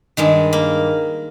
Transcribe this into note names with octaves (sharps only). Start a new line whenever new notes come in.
G2 D#3 G#3
A#3